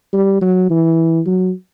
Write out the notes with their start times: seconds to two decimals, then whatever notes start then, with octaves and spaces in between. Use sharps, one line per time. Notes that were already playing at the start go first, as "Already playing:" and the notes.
0.13 G3
0.41 F#3
0.70 E3
1.26 F#3